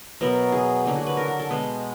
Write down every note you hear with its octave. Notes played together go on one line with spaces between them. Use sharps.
B2 F#3 B3 A#4
G#4
D3 F#3 A#3
F#4
B4
A#4
A#4
A4
B2 G#3 B3